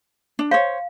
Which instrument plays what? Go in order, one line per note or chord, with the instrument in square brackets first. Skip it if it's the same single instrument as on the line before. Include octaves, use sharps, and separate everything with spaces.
[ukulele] D4
[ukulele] C5 C#5 [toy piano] F5